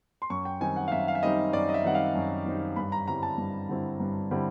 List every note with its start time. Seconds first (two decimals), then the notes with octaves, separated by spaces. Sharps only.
0.22 C6
0.30 F#2 C#6
0.45 G5
0.61 D#3 G3 C4 D#4 G#5
0.76 F#5
0.88 F5
0.92 F#2 E5
1.08 F5
1.15 E5
1.23 D#3 G3 C4 D#4 D#5
1.53 F#2 D5
1.69 D#5
1.74 E5
1.84 D#3 G3 C4 D#4 F#5
1.95 F5
2.15 F#2
2.46 D#3 G3 C4 D#4
2.76 G2 B5
2.92 A#5
3.08 D3 G3 C4 E4 A#5
3.23 A5
3.38 G2
3.69 D3 G3 C4 E4
4.00 G2
4.31 D3 G3 C4 E4